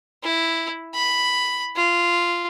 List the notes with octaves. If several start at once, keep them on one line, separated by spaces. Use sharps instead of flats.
E4
B5
F4